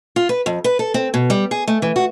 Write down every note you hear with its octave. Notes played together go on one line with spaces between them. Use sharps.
F4
B4
F2
B4
A4
C4
B2
G3
G#4
A3
E3
F#4